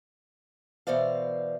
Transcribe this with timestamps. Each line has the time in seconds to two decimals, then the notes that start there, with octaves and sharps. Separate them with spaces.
0.87 B2 E3 C5 D5 F5